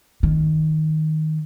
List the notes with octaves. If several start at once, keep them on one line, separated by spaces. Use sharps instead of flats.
D#3